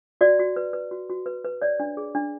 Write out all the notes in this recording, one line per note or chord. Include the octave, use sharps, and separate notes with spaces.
F#4 D5
F#4
B4
B4
F#4
F#4
B4
B4
C#5 D5
D4
G#4
D4